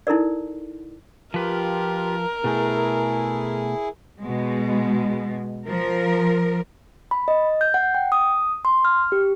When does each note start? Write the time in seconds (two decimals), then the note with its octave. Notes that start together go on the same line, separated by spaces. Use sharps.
0.07 D#4 E4 A4 A#4 D5
1.34 F3 F4 G4 A#4 B4
2.44 B2 A3 E4 G#4
4.20 B2 G#3
5.67 F3 A#4
7.11 B5
7.28 D#5
7.61 G6
7.74 F#5
7.95 G5
8.12 D#6
8.65 C6
8.85 F6
9.12 G4